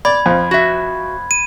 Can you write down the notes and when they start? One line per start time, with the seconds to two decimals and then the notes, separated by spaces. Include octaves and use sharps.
0.05 D5 B5 G#6
0.26 F2 F3
0.51 F#4 E5
1.31 D#7